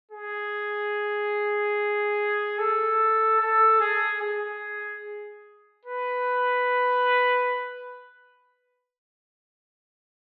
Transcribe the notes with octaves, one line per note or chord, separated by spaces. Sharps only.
G#4
A4
A4
G#4
G#4
B4